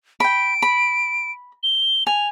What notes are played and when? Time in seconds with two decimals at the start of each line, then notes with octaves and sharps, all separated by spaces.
0.20 G5 B5 D7
0.62 B5
1.63 G7
2.07 G#5 F7